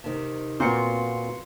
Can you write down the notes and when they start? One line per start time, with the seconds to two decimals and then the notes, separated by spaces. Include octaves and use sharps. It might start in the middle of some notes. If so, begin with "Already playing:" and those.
0.04 C3 D#3
0.60 A#2 B3 C4 F4 F#4 C6 C#7